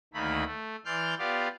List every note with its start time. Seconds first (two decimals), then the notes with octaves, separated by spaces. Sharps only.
0.14 D2 D#3 A3 A#3 B5
0.46 A3
0.85 E3 D5 C6 F6 G6
1.18 B3 F4 G4 D5 F5